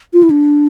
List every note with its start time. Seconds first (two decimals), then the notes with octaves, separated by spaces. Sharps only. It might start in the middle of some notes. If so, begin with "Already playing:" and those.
0.13 F4
0.23 E4
0.30 D4